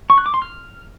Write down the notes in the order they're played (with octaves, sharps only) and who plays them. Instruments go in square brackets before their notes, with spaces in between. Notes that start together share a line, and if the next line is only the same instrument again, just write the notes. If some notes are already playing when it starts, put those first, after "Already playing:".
[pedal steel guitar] C#6
F#6
D6
C6
F6